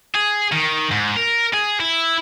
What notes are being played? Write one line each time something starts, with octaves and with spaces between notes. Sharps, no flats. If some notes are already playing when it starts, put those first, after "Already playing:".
G#4
D#3
G#2
A#4
G#4
E4